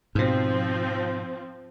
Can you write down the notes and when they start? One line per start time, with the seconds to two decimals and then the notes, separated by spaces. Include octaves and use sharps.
0.15 G#2 B2 F3 C4